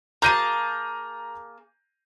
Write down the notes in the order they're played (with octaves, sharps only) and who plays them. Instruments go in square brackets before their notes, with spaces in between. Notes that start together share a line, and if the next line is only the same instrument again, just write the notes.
[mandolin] A#3 G#4 A5 [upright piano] A#5 G6 D#7